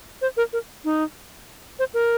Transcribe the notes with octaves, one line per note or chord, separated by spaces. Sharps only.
C5
A#4
A#4
D#4
C5
A#4